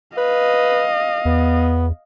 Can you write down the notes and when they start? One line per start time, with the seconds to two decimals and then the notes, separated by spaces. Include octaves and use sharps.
0.18 B4 D#5 F5
1.25 E2 B3